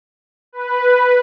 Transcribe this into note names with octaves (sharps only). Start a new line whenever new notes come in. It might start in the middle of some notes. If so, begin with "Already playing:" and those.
B4